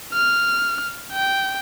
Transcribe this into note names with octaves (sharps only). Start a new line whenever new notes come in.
F6
G5